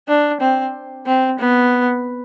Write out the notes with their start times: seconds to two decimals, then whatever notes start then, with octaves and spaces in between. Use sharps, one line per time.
0.08 D4
0.40 C4
1.06 C4
1.39 B3